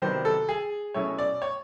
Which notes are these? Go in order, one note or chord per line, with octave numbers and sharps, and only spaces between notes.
C3 D#3 F#3 B3 D4 C5
A4
G#4
B2 F#3 A3 C#4 E4 C#5
D5
C#5